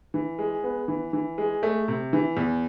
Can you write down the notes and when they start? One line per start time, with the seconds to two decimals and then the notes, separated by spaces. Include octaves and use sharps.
0.14 E3
0.38 G#3
0.64 B3
0.88 E3
1.13 E3
1.38 G#3
1.63 A3
1.88 C3
2.13 E3
2.37 E2